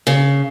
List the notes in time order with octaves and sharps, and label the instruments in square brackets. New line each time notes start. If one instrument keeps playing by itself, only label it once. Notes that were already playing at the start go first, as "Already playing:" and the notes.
[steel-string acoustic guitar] C#3